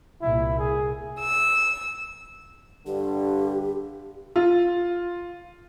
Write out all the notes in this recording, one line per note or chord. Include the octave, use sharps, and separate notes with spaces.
C2 A#2 E4
G#4
E6
G2 D3 G4
F4